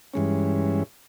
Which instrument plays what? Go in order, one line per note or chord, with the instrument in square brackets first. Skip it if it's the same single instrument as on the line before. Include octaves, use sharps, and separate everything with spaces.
[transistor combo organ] G2 E3 G#3 C#4